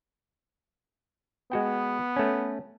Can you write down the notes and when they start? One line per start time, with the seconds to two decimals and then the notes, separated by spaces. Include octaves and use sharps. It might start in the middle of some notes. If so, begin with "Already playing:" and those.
1.52 G#3 B3 F#4 G5
2.16 A3 C#4